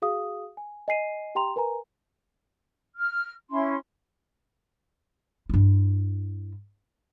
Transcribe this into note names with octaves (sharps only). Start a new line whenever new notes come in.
F#4 G#4 F5 D#6
G#5
D#5 G#5 C7 D#7
G4 G5 A#5 C6 F7
A#4 B4 G#5 A#5
F6
C#4 E4 C6
G2 E4